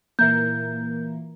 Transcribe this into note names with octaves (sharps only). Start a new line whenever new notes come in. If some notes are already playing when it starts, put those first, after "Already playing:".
A#2 E3 A#3 G6